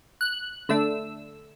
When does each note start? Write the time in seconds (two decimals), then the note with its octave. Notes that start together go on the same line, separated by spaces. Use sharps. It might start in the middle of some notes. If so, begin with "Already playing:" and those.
0.21 F#6
0.69 D3 A3 D4 E6